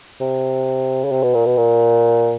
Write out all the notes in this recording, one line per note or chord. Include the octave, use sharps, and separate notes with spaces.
C3
C#3
C3
B2
A#2
B2
A#2